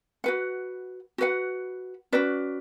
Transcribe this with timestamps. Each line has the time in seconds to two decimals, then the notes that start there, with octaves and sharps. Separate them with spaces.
0.24 F#4 B4 F#5
1.18 F#4 B4 F#5
2.13 C#4 F#4 B4 D5